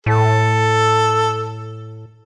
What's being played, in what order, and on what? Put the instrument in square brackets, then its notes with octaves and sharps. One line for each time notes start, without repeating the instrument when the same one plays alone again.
[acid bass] A2 [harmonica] A4